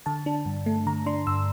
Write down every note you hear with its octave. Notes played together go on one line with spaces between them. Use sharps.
D3 A5
D4
G2
A3
D3 A#5
D4 C6
G2 E6